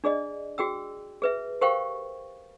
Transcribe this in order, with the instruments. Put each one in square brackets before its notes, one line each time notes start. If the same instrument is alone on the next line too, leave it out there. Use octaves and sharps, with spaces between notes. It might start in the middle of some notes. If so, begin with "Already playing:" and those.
[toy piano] D4 G#4 D5 D#5
F#4 G#4 G5 E6
G#4 B4 E5
G4 A#4 C5 F5 G5 C#6